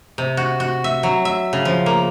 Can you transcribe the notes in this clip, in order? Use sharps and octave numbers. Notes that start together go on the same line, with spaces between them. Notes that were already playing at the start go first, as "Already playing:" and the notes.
C3
F#4
F#4
E5
F#3
E5
C#3
F3
A#3